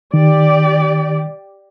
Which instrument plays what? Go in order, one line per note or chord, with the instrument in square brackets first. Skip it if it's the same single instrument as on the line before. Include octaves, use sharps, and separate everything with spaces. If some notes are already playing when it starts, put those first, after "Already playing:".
[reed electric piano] D#3 [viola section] G4 D5